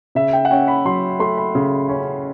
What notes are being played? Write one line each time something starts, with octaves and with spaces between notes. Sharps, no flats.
C#3 E5
G5
F#5
C#4 G5
B5
F#3 C6
A3 C6
B5
C#3
C#4